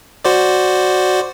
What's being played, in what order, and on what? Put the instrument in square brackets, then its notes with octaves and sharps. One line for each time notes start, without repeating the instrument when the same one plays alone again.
[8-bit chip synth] F#4 C5 D5